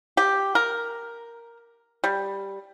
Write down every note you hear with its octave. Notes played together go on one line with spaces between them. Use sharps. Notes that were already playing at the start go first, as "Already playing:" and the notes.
G4
A#4
G3